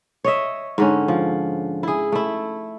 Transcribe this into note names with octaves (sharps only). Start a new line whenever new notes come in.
C#5 D#5 E5
G#2 D3 C#4
F3
E4 G#4
A3 E4